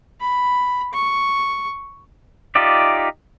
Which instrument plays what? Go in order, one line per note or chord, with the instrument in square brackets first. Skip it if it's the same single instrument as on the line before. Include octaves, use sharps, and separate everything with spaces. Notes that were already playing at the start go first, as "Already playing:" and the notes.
[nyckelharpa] B5
C#6
[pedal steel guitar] D#4 F4 G4 D5 E5